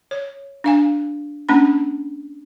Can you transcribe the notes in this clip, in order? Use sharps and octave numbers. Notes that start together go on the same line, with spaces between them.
C#5
D4 F5 G#5
A#3 C#4 D4 B5